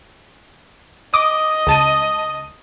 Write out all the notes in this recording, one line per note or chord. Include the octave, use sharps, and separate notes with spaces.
D#5 D6 D#6
C#2 A5 D#7